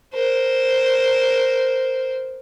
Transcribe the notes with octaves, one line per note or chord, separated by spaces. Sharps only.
A#4 C5